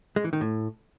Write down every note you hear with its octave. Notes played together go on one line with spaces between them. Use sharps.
G#3
E3
D#3
A2